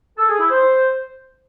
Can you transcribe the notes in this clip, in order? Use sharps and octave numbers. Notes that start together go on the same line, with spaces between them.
A4
G#4
E4
C5